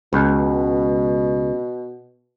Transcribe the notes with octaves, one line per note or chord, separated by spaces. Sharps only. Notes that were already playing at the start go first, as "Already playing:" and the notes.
C#2 B2